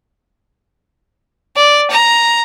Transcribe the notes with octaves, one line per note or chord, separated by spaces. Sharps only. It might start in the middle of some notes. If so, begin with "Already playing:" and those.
D5
A#5